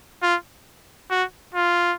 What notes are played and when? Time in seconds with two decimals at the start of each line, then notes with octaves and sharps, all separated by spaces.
0.22 F4
1.10 F#4
1.55 F4